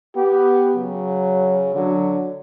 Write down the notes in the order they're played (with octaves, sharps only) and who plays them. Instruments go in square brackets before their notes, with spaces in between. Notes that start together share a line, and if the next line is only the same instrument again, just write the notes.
[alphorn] B3 [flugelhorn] G4
[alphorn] C#3 [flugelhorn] F#3
[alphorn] D3 [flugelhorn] F#3